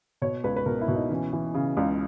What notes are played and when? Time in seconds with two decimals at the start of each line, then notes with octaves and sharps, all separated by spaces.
0.22 B2 C#5
0.44 C#2 B4
0.56 B4
0.66 B2 A#4
0.81 E4
0.88 B2
0.95 D#4
1.10 E3 C#4
1.33 E3
1.54 C#3
1.77 C#2